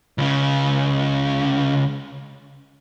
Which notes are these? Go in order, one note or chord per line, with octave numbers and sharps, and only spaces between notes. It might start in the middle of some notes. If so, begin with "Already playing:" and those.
C#2 C#3